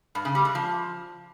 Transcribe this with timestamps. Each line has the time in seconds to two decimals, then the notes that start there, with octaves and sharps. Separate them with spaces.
0.15 G2
0.25 C#3
0.35 G3
0.45 G#3
0.55 F3